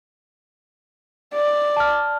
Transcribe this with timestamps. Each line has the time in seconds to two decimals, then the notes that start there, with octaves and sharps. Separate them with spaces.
1.35 D5
1.77 A5 F6